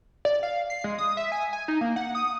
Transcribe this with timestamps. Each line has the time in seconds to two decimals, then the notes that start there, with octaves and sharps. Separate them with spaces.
0.25 D5
0.43 F5
0.70 C7
0.84 G#3
0.98 D#6
1.17 E5
1.32 G#5
1.53 G#5
1.68 D#4
1.81 A#3
1.96 F#5
2.15 D#6